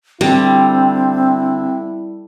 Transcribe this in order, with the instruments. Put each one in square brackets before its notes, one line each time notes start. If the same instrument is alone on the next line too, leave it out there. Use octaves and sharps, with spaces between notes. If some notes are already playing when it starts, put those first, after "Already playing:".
[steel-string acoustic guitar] D3 [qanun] G3 [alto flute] C4 [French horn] E4